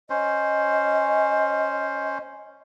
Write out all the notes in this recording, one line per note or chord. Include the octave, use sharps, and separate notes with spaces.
C#4 C5 D#5